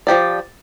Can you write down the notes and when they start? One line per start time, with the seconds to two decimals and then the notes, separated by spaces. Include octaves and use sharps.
0.07 F3 C4 G4 D5